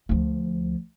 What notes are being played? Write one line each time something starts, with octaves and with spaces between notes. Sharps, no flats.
D2 F3